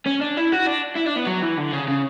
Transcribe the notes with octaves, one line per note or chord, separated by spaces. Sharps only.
C#4
D4
E4
F#4
D4
E4
D4
B3
F#3
E3
D3
C#3
C#3